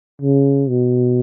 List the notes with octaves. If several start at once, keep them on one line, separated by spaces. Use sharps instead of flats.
C#3
B2